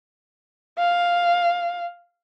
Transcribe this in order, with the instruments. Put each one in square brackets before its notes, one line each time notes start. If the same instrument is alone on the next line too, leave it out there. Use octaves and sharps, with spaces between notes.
[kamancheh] F5